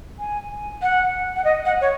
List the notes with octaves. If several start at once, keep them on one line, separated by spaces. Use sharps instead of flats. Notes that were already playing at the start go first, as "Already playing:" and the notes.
G#5
F#5
F#5
D#5
F#5
C#5